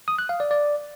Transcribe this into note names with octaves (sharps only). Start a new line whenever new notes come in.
D#6
F#6
F5
D5
D5